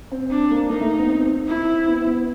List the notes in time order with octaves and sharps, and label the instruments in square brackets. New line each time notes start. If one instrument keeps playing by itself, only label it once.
[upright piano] C4
[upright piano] C4 [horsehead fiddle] D4
[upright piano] A#3
[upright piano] A#3 [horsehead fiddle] D#4
[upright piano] A3
A#3
B3
C4
[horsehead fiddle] E4
[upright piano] B3
B3